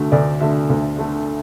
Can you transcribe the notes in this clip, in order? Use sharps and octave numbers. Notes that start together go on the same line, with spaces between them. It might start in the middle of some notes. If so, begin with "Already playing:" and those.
Already playing: D2 D3 A3 F#4
D2 D5
D3 A3 E5
D2
D3 A3